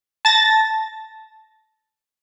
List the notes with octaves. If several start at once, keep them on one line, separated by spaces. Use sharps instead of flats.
A5 A6 A#6